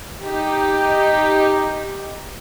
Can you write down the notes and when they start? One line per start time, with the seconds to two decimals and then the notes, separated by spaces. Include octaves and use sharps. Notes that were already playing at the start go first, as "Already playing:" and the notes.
0.21 D#4 G4